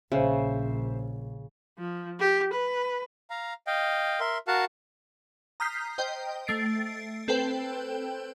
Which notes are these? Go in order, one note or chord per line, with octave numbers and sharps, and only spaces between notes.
A#1 C#3 C5 E5
F3
G4
B4
F5 A#5
D#5 F5 G5
A#4 E5 C6
F#4 A#4 F5 F#5 A5
A#5 D#6 F6 G6 B6 C7
C5 D#5 G5
A3 A6 C7 D7
C4 A4 B4 C5 G5